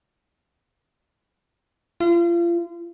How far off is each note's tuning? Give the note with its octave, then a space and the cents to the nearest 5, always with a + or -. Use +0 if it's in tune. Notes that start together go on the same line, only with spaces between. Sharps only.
F4 -35